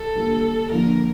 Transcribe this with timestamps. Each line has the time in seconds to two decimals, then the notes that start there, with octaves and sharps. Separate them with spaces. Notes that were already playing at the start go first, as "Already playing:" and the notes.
Already playing: A4
0.15 D3 G3 A#3
0.70 D3 F3 A#3 A#4